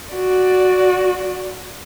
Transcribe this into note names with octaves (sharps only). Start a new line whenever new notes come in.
F#4 D5